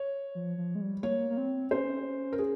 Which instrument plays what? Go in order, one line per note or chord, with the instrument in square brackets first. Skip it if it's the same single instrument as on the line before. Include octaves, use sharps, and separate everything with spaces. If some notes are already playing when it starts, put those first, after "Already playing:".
Already playing: [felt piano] C#5
[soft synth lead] F3
F3
G#3
G3
[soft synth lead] A#3 [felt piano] C#5
[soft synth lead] A#3
C4
[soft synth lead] C#4 [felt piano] C5
[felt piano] A#4
G#4